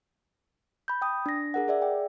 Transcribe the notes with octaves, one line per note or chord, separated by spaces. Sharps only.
B5 G6
G5 D#6
D4 A#6
G#4 A#4 F#5
G#4 D5 E5
G5